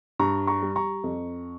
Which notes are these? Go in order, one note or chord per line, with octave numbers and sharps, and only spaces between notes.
G2 A#5 C#6
A#5 C#6
G3
A#5 C#6
F2